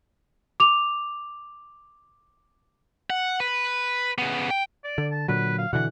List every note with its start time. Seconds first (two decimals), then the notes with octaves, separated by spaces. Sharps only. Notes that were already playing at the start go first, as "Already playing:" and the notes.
0.60 D6 F7
3.10 F#5
3.40 B4
4.18 C#3 B3
4.50 G5
4.84 D5
4.98 D3
5.11 A5
5.28 A#2 D3 F#3 B4
5.58 F5
5.73 B2 D3 E3 F#5